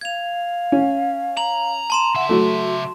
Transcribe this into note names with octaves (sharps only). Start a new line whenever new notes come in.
F5 G#6 F7
C#4
A#5 F#7
A5 C6 E7
C#3 E5 F#5
F#3 A3 F#4